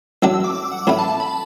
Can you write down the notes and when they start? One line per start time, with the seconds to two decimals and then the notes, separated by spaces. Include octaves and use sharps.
0.22 A1 A2 F#3 D4 E6
0.34 E6
0.44 D6
0.55 D6
0.71 F#5
0.87 A1 A2 A3 B5
0.99 A5
1.10 A5
1.20 B5